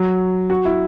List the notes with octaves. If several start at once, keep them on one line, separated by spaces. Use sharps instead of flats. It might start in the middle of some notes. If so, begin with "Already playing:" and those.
Already playing: F#3
F#4
E4